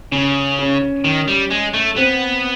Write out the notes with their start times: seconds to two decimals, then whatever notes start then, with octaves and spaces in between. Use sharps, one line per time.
0.12 C#3 C#4
0.59 C#4
1.04 D#3
1.28 G3
1.51 G#3
1.74 A3
1.97 B3 C4